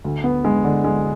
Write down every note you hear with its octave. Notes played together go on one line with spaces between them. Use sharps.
D2
B3
G#3
D3
G#3